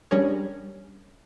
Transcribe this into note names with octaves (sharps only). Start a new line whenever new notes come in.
G3 C#4 D4 G#4 A#4 C#5